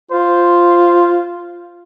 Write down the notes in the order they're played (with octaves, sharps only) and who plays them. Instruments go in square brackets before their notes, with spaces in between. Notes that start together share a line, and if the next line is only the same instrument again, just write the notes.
[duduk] F4 [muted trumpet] C5